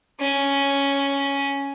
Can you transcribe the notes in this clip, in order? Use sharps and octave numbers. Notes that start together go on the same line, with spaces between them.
C#4